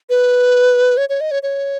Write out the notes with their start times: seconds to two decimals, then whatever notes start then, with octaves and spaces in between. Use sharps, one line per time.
0.10 B4
0.97 C#5
1.09 C#5
1.21 D#5
1.31 C#5
1.43 C#5